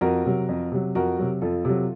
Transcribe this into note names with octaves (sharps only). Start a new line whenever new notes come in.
F2 F#4 A#4
C3 F#3
F2
C3 F#3
F2 F#4 A#4
C3 F#3
F2 F4 A4
C3 F#3